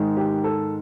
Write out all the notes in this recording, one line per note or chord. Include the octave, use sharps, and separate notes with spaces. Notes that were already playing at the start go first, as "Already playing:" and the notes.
Already playing: G#2 D#3 G#3
G4
A4